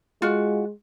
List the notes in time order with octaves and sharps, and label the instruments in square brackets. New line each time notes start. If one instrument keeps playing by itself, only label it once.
[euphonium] G#3 [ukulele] F4 F#4